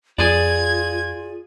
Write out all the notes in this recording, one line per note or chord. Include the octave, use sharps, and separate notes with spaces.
F2 F4 G#4 D5 G#6